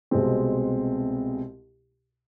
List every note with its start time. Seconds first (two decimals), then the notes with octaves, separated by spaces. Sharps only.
0.11 C2 B2 G#3 C4